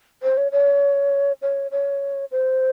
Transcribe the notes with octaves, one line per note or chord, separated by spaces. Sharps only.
C5
C#5
C#5
C#5
C#5
C5